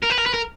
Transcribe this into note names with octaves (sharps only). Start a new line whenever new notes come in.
A#4
B4
A#4
B4
A#4